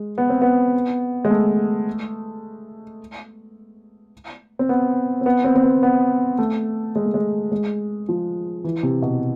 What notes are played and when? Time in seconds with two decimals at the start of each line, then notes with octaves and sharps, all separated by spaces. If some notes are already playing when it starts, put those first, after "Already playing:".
Already playing: G#3
0.18 B3
0.30 C4
0.42 B3
1.25 G#3
1.30 A3
4.59 C4
4.69 B3
5.21 C4
5.26 B3
5.44 C4
5.56 C4
5.63 B3
5.83 B3
6.38 A3
6.96 G#3
7.05 A3
7.14 G#3
7.52 G#3
8.09 F3
8.64 E3
8.83 C3
9.02 B2